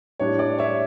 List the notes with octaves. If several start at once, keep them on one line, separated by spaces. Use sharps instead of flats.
A2 G3 D4 C#5
D5
C#5 E5